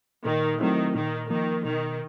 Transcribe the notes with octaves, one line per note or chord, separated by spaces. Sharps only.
A#2 D#3
D#3 F#3 A3 C4 E4
A#2 D#3
D#3 F3 A#3
B2 D#3